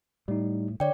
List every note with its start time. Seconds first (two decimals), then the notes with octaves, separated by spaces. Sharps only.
0.28 A2 G3 D#4
0.80 D3 C#5 D5 G5